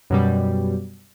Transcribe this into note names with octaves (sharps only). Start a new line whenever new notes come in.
F#2 B2 G3